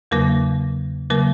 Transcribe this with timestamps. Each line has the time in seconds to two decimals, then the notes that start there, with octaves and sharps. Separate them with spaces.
0.11 E2 C#3 F#3 A#3 A#4
1.10 C#3 F#3 A#3 A#4